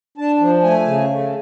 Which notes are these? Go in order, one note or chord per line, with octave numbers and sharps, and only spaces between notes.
D4 A5
F3
A3 G#5
C#3
A3